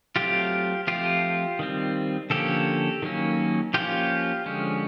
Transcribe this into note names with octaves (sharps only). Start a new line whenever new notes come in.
F#3 A3 C4 F4 G4
F3 A3 C4 F4 G4
D#3 G3 C4
D3 F3 A#3 C#4 G4 A4
D#3 F#3 A#3 C#4
F3 A#3 C#4 F4 G4
D3 F3 G#3 C#4